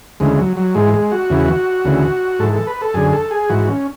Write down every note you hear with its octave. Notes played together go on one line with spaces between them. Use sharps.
D2 C#3 E3 G#3
F#3
F#3
G#2 E3 G#3
G#3
F#4
E2 C#3 E3
D2 C#3 E3
G#2 E3 A4
A4
B4
A4
F#2 D3 G#4
A4
G#4
G#2 E3 F#4
C#4